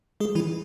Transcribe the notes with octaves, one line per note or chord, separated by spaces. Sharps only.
G#3 G#4
E3 E4